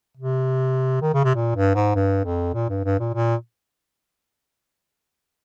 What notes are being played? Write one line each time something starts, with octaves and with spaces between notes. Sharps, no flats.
C3
D#3
C#3
C3
A#2
G2
G#2
G2
F2
A#2
G2
G2
A#2
A#2